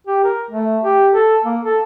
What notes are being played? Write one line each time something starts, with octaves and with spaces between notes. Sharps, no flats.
G4
A#4
A3
G4
A4
A#3
A4